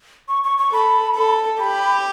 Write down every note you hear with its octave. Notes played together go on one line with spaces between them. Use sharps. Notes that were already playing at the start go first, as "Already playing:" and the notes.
C#6
C#6
C#6
A4 B5
A4
G4 B5